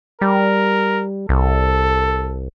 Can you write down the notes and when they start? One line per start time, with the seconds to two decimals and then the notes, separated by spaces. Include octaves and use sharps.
0.22 G3 A#4
1.29 C2 A4